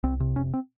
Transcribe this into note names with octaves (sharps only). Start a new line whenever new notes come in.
C2 C4
C3
F1 C#4
C4